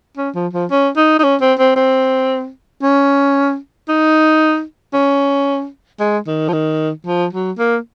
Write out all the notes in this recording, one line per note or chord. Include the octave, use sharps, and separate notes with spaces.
C#4
F3
F3
C#4
D#4
D#4
C#4
C4
C4
C4
C#4
D#4
C#4
G#3
D#3
F3
D#3
F3
F#3
A#3